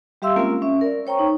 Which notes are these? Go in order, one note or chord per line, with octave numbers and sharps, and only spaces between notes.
G3 G4 E5 F5 C6 E6
G#3 A#3 C4 C#4 F4 A#4
C#4 E5
A#4 D5
C5 C#5 G5 A#5 C#6
D#4